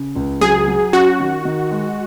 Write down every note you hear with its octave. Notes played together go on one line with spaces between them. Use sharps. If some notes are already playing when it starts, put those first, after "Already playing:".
Already playing: C#3
C#2
F#3 G#4
F#3
C#4 F#4
D#3
D#3
G#3